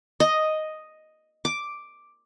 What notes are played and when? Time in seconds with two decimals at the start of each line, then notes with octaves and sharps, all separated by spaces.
0.20 D#5
1.45 D6